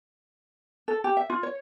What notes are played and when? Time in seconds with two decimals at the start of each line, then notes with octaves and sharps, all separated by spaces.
0.88 A4
1.04 G4
1.17 E5
1.30 F4
1.43 C#5